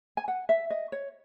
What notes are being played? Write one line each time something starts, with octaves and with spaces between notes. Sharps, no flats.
G#5
F#5
E5
D#5
C#5